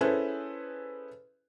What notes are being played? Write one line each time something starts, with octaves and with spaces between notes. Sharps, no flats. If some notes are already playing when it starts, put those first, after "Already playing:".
C#4 E4 G#4 A4 B4 C5